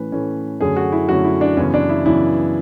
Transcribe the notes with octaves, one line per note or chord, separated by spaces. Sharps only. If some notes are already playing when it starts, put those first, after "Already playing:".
Already playing: A2 E3 A3 C#4 B4
A2 E3 A3 C#4
F#2 D3 A3 C#4 G#4
F#4
E4
F#2 D3 A3 C#4 F#4
E4
D4
F#2 C#3 E3 B3 C#4
D4
E4
F#2 C#3 E3 B3 E4